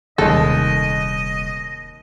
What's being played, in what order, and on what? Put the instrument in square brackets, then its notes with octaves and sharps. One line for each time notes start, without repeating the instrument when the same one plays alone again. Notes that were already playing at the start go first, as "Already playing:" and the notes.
[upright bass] D#1 C3 [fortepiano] D#2 G#3 [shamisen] A4 [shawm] D#5